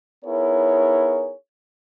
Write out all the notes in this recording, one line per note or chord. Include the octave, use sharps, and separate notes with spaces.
B3 D#4 E4 G#4 A#4 C#5